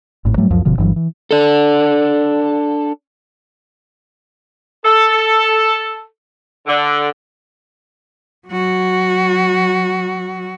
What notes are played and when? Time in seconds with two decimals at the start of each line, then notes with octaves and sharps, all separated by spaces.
0.25 G#1 A2
0.37 G#2 F#3 G3 A3
0.50 C#2 F#2 F3 F#3
0.65 F#1 B2 D3 F3
0.78 G1 G2 E3 F#3
0.96 E3
1.31 D4 A4
4.85 A4
6.66 D3
8.48 F#3 F#4